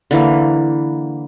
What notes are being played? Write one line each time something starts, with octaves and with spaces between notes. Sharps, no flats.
D3 E3 A#3